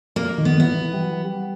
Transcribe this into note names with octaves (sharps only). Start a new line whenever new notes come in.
A#3
D#3
B3
E3 B3
E3
G3
F#3
G3